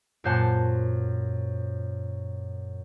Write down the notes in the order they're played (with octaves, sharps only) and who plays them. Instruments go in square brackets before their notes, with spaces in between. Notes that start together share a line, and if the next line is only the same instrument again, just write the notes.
[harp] F#2 A#2 C5 F#5 A5